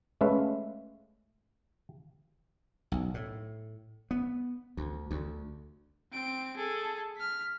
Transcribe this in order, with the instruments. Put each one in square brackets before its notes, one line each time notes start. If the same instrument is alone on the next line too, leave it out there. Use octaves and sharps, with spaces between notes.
[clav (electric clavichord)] G#3 A3 C#4 B4 E5 F5
[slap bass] B1
A2
B3
D2
D2
[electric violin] C4 D7
G#4 A4
F6 B6